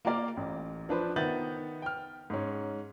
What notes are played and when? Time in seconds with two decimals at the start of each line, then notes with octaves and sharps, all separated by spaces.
0.05 A#3 F4 A#4 D5 F5
0.37 A1
0.89 F3 D4 B4 C5
1.16 D#3 B3 E5 G6 A6 F#7
1.82 G5 F6
2.30 G#2 C#4